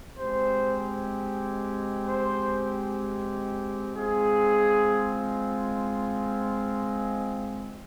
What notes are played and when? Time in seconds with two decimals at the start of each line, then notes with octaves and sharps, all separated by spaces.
0.18 G#3 C4 G4 C5
2.07 C5
3.95 G#3 C4 F4 G#4